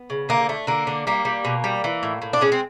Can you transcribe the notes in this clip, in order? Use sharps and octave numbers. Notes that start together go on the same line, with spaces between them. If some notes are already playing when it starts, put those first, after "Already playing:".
Already playing: B3
C#3
D3 A#3
A3
D3 A#3
D3
G3 A#3
G3
B2
G3
E3
A2
A2
D4
G#3 C#4
C4